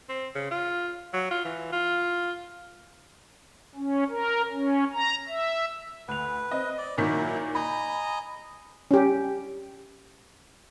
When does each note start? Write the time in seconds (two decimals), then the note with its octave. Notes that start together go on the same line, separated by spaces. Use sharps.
0.09 C4
0.35 C#3
0.51 F4
1.13 F#3
1.31 F4
1.45 E3
1.72 F4
3.75 C#4
4.09 A#4
4.52 C#4
4.93 A#5
5.28 E5
6.08 D2 B4 F7
6.51 C4 D#5
6.78 D5
6.98 A#2 D#3 F#3 E4 B6
7.55 D#5 G#5 A#5 B5
8.91 C#4 G4